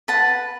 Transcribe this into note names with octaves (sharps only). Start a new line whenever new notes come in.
B4 F#5 A5